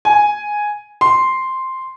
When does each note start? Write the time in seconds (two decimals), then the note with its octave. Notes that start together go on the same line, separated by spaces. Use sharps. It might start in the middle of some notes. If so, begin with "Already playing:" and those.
0.05 G#5
1.01 C6